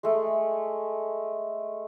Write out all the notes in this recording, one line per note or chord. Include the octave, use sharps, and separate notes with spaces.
G#3 A3